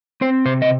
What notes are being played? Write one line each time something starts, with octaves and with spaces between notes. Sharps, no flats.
C4 C5
C3 C5
D#5